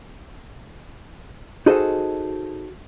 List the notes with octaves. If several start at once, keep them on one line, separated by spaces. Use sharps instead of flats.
D#4 F#4 G#4 A4 C5 D#5